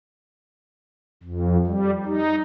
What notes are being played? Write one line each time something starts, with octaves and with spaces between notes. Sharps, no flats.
F2
G3
D#4